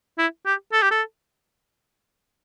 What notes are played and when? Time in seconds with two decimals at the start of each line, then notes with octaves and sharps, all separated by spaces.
0.18 E4
0.46 G4
0.73 A4
0.82 G4
0.91 A4